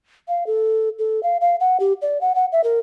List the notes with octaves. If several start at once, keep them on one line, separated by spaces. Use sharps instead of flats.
F5
A4
A4
F5
F5
F#5
G4
D5
F#5
F#5
E5
A#4